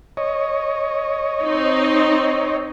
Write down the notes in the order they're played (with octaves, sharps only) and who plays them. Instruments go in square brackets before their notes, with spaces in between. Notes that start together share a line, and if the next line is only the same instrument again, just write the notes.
[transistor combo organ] C#5 D#5
[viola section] C4 D#4